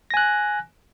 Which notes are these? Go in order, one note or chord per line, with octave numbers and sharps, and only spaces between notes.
G#5 F#6 A#6